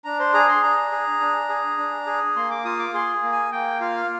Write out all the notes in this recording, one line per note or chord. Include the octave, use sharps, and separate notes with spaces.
D4 A#5
C5
G#4 A#5
C6
D4 A#5
G#4
D4
G#4
D4
G#4
A#3 C6
D6
F4 D#6
D6
G#4 C6
A#3
G#5
A#3 G5
F4 F5